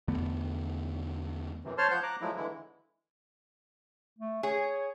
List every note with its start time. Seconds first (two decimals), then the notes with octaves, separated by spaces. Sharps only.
0.08 E2 D3 A3 B3
1.65 F#2 C3 E3
1.78 C5 C#5 A5 C6 F6
1.91 F3 C5 F#5 G6
2.03 A#5 D6 F#6
2.21 F3 F#3 G#3 A3 E4
2.37 D3 E3 G#3 E4
4.18 A3
4.43 G#4 C#5